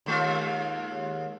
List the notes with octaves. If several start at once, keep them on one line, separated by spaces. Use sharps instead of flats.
D#2 G#3 F4